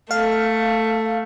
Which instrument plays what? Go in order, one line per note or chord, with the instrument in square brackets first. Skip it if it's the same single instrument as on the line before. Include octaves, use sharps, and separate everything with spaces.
[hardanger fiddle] A3 [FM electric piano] F5